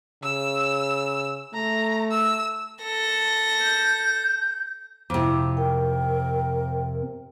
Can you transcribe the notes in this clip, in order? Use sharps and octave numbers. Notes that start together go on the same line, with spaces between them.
C#3 E6
A3 A#5
E6
A4 A#6
G6
F2 C3 E4 D6
A#4 G5